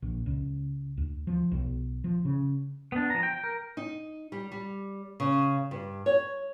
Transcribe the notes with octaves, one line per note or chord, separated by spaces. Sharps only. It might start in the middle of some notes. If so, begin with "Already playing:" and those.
A#1
C#2
D2
F3
B1
F3
C#3
B3 D4
F3 A#5
G5
A#4
D#4
G3
G3
C#3
G2
C#5